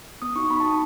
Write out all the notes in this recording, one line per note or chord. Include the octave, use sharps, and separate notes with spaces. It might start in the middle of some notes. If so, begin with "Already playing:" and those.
B3 D#6
D#4 F#4 C#6
B3 B5
A5
D#4 F#4